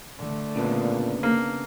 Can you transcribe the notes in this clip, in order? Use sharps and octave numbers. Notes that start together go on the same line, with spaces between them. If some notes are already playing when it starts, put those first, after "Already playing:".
D3 A3
A#2 C#3 B3 D4
A#3